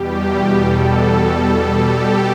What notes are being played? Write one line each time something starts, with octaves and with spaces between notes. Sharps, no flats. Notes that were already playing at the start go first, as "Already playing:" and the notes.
Already playing: E2 B2 G3 G4
E2 B2 G3 A4
B2 G3
G4